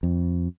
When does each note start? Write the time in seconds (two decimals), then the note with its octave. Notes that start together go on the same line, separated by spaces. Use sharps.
0.03 F2